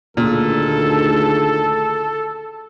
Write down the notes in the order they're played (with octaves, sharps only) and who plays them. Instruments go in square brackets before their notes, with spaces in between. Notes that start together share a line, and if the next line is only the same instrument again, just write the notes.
[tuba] D2 [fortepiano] A#2 [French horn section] D#3 F4 G#4 [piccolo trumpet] A4